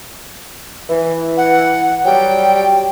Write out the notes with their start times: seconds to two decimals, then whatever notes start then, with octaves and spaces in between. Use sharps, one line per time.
0.89 E3
1.37 F#5
2.05 F#3 G3 G5